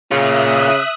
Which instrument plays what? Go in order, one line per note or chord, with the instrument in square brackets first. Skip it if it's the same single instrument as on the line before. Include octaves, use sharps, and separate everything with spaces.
[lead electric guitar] A#2 F4 [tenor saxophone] C#3 [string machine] E5 D#6 F#6